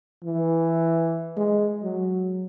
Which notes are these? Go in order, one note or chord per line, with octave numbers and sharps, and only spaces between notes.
E3
G#3
F#3